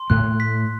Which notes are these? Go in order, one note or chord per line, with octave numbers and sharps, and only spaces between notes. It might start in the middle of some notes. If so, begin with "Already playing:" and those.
Already playing: C6
A2 A3 F#6
B6